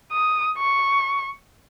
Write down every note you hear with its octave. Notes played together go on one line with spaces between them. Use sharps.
D#6
C#6